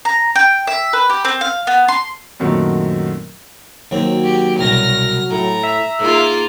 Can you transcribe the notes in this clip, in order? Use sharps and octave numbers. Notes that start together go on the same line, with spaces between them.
A#5
G5
E5
B4
G4
C4
F5
B3
C6
F#2 A#2 D#3 F#3 A3 C4
D#2 F#3 C4
G4
C2 B2 F6 A#6
A2 A#5
E5
G#2 A#3 F4